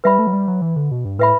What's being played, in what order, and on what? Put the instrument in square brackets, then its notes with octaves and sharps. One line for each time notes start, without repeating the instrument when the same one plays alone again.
[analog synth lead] G3 [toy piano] B4 E5 B5
[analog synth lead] A3
F#3
G3
F#3
E3
D3
B2
G2
[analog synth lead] A2 [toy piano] B4 E5 B5